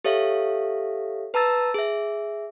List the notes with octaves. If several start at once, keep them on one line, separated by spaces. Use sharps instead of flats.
G4 A4 C#5 E5 F5
B4 A5 A#5 E6 A6
G#4 E5